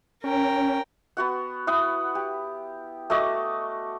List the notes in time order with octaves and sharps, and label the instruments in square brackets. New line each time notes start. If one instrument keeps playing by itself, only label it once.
[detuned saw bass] C#4 [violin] A#4 G5
[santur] B3 F#4 F#5
E4 F#5 D#6
G4
A3 F#4 D#5 D6